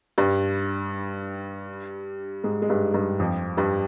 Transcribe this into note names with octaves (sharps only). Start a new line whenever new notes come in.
G2 G3
G#2 G#3
G#3
G2 G3
G2 G3
F2 F3
G2 G3